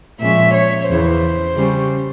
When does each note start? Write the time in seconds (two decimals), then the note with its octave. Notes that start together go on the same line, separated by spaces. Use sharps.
0.20 A#2 F3 G#3 C#4 E5
0.53 C#5
0.88 E2 C#3 E3 C5
1.56 C#3 G3 C#4